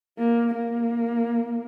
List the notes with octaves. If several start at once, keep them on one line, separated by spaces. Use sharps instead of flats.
A#3
A#3